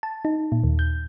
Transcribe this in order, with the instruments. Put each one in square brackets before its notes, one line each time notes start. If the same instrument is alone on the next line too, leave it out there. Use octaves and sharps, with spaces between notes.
[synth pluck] A5
D#4
A#2
D#2
G6